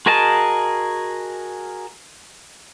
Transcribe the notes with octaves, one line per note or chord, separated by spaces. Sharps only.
F#4 G#4 A#4 D#5 A5